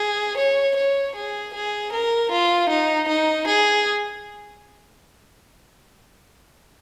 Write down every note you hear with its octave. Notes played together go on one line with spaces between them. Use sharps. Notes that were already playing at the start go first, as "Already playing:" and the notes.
Already playing: G#4
C#5
C#5
G#4
G#4
A#4
F4
D#4
D#4
G#4